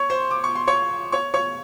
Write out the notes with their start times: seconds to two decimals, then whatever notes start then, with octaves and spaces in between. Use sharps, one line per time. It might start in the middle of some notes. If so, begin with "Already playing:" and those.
Already playing: C#5 C#6
0.10 C5 C6
0.31 D6
0.44 C#6
0.55 C6
0.67 C#5 C#6
1.12 C#5 C#6
1.34 C#5 C#6